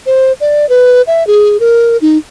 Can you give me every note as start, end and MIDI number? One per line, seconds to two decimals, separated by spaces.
0.06 0.32 72
0.40 0.68 74
0.69 1.02 71
1.07 1.26 76
1.27 1.57 68
1.60 1.97 70
2.02 2.18 63